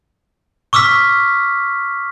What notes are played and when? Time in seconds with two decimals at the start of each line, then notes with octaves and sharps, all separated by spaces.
0.73 C#6 D6 E6 F6 B6